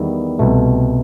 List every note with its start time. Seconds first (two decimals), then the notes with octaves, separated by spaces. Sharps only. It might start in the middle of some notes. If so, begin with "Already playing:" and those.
Already playing: E2 D#3 G3 B3 E4
0.39 C2 B2 A3